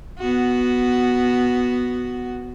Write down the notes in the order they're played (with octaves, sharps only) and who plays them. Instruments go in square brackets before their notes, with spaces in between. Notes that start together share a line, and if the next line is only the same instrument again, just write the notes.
[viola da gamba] B3 F#4